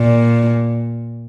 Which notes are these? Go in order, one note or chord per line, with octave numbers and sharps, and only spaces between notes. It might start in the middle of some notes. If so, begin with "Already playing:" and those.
Already playing: A#2